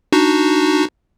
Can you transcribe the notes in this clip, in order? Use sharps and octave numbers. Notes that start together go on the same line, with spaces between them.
D4 D#4 F#4